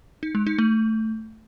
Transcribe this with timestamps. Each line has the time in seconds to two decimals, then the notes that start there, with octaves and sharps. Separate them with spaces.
0.23 D#4
0.35 G#3
0.47 D#4
0.58 A3